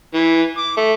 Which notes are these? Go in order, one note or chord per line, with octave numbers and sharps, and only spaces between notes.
E3
D6
A3